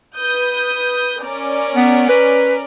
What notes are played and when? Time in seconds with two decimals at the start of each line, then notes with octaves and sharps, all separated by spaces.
0.16 B4 D#6 G6
1.21 C#4 A#4 D5
1.75 B3
2.09 B4